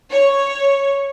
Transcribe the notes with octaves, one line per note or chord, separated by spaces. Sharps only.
C#5